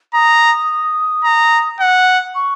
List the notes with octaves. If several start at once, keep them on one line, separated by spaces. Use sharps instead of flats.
A#5 D#6
A#5
F#5
C#6